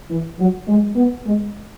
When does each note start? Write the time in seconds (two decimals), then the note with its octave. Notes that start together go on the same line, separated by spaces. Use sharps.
0.10 E3
0.39 F#3
0.68 G#3
0.96 B3
1.25 G#3